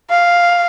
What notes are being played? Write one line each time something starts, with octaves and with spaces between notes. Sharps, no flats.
F5